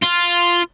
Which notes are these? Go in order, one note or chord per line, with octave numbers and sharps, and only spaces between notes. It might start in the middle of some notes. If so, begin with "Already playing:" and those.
F4